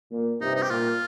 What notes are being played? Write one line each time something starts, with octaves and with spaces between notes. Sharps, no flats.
A#2
G2 C3 D#4
D#4
G4
A#2 F4